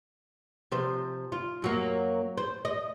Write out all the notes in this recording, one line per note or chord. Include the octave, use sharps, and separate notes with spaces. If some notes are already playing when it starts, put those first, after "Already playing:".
C3 F3 C5
F4
F#2 F#3 A#3
C5
D#5